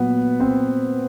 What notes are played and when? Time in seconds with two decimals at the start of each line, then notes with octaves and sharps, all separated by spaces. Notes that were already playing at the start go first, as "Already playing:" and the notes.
Already playing: A#2 F#3 B3 B4
0.40 C4 C5